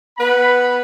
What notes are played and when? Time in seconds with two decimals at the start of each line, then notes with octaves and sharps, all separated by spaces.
0.18 B3 B4 B5